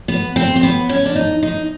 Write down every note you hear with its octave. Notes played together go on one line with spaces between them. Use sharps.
B3
C4
C4
B3
C#4
D4
D#4
D#4